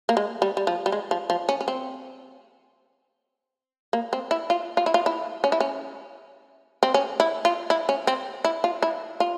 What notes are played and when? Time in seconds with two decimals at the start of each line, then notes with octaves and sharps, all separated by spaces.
0.09 A#3
0.17 G#3
0.42 G3
0.57 G3
0.67 F3
0.86 G3
0.92 G#3
1.11 F3
1.30 F3
1.49 C#4
1.61 C#4
1.68 C4
3.93 A#3
4.13 C4
4.31 E4
4.50 F4
4.77 F4
4.86 E4
4.94 F4
5.06 E4
5.44 C#4
5.52 E4
5.60 C#4
6.83 C4
6.94 C#4
7.20 E4
7.45 F4
7.70 E4
7.89 C#4
8.07 C4
8.44 E4
8.64 F4
8.82 E4
9.20 F4